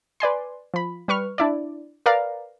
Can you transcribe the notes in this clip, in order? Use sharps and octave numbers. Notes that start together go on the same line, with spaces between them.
B4 D5 G#5 C6
F3 B5
G3 B4 C#6 F6
D4 E4 D5
A#4 B4 D5 F5 A#5